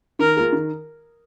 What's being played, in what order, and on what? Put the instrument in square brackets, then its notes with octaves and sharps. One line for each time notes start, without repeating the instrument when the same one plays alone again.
[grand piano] D#3 [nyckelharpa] A#4
[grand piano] A#3 F4 G#4
D#3